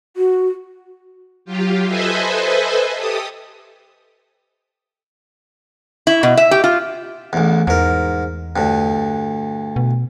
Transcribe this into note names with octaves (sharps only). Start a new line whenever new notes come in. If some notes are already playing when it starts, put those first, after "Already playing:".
F#4
F#3 F4 G4
A4 B4 C5 D#5 E5 G#5
G4 A4 D#6
E4
B2
E5
G4
F4
A1 E2
E2 G#2 A#4
D2 G2
B2